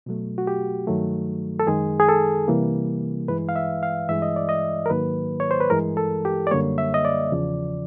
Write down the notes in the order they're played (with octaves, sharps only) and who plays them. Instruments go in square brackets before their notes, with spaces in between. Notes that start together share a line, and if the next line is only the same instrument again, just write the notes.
[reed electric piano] B2 F#3 A3
F#4
G4
G2 D#3 F#3 A3
A4
F#2 D#3 G#3 G#4
G#4
A4
C3 E3 G3 A#3
G2 E3 G#3 B4
F5
E5
F5
G2 E3 G#3 E5
D#5
D5
D#5
A#4
G#2 D#3 F#3 A#3 B4
C#5
C5
B4
G2 E3 G#3 A#4
A4
G4
D5
F#2 D3 G3 A#3 C#5
E5
D#5
D5
E2 C#3 F3